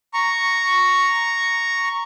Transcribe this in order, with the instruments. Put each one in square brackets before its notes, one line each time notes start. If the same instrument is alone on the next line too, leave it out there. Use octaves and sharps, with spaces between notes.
[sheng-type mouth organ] A#5 C#6